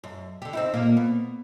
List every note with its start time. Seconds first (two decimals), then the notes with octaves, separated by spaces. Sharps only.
0.04 F#2
0.42 D3 G4
0.53 C4 D#4 E4
0.73 A#2 A#3
0.97 B3